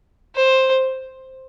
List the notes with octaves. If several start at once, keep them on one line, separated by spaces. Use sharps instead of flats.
C5